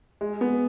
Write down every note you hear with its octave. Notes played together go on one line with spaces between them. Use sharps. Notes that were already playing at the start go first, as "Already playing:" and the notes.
G#3
B3